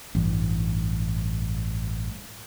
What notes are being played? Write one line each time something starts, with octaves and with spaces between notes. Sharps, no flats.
A1 G2